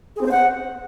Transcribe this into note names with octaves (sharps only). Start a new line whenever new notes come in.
G#4
C4
C5
F#5